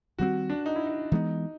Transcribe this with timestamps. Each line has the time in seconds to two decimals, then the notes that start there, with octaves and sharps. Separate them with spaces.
0.18 D#3 G3 C4 F#4
0.50 D4
0.66 D#4
0.76 E4
0.87 D#4
1.12 E3 G#3 B3 D#4